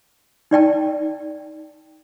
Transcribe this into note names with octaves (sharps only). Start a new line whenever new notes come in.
D#4 D5 G5 A5